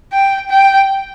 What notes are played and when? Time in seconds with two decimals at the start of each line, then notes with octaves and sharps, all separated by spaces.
0.13 G5
0.50 G5